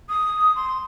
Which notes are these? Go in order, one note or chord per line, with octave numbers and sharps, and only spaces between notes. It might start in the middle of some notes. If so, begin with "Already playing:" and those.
D#6
C6